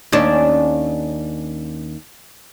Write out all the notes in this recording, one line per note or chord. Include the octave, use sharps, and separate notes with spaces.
D#2 C#4 D4